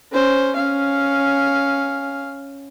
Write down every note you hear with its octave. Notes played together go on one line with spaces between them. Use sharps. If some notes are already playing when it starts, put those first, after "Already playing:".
C#4 C5
C#4 F5